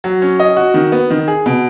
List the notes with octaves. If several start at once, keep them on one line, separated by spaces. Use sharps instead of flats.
F#3
C#4
D#5
F#4
D#3
B3
D#3
G#4
B2